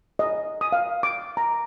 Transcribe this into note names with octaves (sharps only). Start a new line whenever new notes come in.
D#5
D#6
F5
D6
A#5